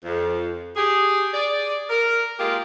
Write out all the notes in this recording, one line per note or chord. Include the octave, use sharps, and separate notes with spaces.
F2
G4 G#4
G#4 D5
A#4
G#3 A#3 F4 G4 G#4